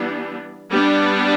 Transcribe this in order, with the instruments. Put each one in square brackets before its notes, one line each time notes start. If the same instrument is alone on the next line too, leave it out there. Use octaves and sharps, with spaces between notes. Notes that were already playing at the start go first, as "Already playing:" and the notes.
Already playing: [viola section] E3 G3 B3 D4
G3 B3 D4